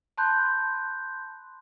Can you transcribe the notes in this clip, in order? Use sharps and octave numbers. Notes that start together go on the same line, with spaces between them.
A5 B5 C6 F#6 G6